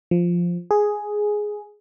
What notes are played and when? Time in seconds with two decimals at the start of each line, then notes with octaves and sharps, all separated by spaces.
0.11 F3
0.71 G#4